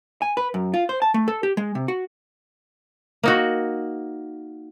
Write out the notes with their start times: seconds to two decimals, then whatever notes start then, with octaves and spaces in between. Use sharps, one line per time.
0.22 G#5
0.37 B4
0.54 F#2
0.74 F4
0.89 C5
1.02 A5
1.14 A3
1.28 A4
1.43 G4
1.57 G#3
1.75 C3
1.88 F#4
3.23 A#3 D#4 F#4